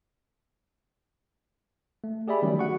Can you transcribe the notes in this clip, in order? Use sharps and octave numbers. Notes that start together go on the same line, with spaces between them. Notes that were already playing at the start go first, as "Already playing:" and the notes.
A3
G4 G#4 D5 E5 B5
D#3 F#3 G3 A3 C#4
F#4 F#5 C#6